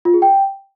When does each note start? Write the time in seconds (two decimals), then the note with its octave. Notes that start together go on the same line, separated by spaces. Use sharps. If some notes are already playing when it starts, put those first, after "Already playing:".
0.05 F4
0.14 G#4
0.22 G5